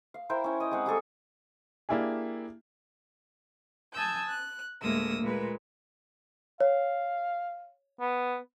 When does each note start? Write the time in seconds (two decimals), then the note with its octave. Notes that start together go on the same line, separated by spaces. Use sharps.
0.14 F5
0.29 E4 A#4 C5 G5
0.44 C#4 E4 C#5
0.60 D#5 G5
0.71 G#3 C4 F#5
0.86 G3 G#4 A4 C#6
1.89 A#3 D4 E4 G4 G#4
3.93 G#5 A5 D#6 E6 G6
4.28 F#6
4.82 D2 A2 G#3 A#3 D#6 E6
5.21 A#2 G#3 B4
6.61 C#5 F5
8.00 B3